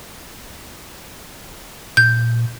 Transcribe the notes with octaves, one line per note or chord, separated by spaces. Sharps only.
A#2 G6